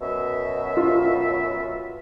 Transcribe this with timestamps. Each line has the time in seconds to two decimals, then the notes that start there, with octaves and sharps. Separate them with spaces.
0.02 F#2 B2 E5
0.77 F4